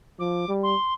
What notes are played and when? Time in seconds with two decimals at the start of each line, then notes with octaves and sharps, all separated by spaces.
0.19 F3 D6
0.48 G3
0.63 C6